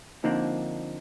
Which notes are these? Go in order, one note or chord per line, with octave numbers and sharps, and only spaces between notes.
D3 F3 A#3 C4 D4 D#4